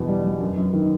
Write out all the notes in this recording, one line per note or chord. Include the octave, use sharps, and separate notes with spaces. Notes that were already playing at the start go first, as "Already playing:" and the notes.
Already playing: E2 B2
G3
G3
F#2
F#2
D#3